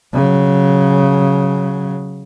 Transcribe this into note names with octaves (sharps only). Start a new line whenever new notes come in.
C#3 F#3